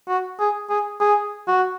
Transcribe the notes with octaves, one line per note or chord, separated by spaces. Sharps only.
F#4
G#4
G#4
G#4
F#4